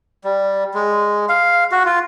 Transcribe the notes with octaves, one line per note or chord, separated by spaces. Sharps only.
G3
G#3
F5
F#4
F4